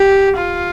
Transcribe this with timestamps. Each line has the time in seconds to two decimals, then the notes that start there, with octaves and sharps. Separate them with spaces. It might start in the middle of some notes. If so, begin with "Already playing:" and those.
Already playing: G4
0.37 F4